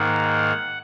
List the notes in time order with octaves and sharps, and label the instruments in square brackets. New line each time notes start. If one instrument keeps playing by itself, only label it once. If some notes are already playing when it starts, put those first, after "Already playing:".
Already playing: [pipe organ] G#2 D#3 A#3 F#5